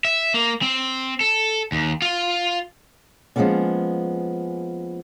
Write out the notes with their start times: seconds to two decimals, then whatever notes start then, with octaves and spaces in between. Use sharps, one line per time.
0.05 E5
0.34 A#3
0.62 C4
1.21 A4
1.72 D#2
2.02 F4
3.36 F3 G#3 A#3 B3 C#4 D4